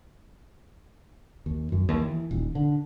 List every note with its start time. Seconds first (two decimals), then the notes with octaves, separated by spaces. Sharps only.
1.46 D#2
1.72 F#2
1.89 D#2
2.01 E3
2.31 D#1
2.55 D3